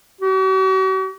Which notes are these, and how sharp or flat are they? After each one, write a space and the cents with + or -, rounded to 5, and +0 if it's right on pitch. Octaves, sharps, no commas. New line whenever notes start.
F#4 +45